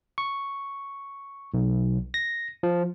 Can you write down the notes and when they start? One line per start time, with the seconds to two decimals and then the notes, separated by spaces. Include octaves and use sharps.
0.18 C#6
1.54 B1
2.14 A#6
2.63 F3